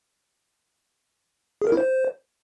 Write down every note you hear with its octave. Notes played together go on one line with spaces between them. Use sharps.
G#4
A#4
E4
C5